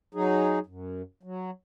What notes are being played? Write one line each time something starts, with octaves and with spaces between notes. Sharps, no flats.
F#3 D#4 G#4
F#2
F#3